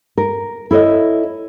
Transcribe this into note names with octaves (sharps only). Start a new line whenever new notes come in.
A#4
E4 A4 C#5 D#5